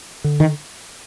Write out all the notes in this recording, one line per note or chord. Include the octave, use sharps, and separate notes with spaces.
D3
D#3